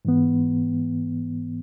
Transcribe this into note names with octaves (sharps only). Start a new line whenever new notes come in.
G#2 E3 B3